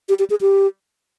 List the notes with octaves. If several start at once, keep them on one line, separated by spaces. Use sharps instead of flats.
G4
G4
G#4
G4